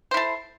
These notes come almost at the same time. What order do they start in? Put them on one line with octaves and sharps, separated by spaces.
C5 E4 A4